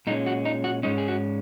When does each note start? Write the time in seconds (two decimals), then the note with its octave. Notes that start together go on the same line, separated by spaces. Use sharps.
0.07 A#2 G#3 C#4 D#4
0.26 F#4
0.45 D#4
0.64 F#4
0.83 G#2 G#3 C#4 D#4
0.98 G#4
1.08 F#4